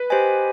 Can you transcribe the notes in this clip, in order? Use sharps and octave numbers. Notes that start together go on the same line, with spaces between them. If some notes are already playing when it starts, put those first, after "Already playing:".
Already playing: B4
G4 C5 D#5 G#5